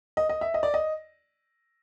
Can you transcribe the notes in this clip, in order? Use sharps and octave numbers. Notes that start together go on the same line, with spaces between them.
D#5
D#5
E5
D#5
D5
D#5